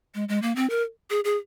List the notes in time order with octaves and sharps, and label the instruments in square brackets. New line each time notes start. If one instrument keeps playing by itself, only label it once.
[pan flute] G#3
G#3
A#3
C4
A#4
G#4
G#4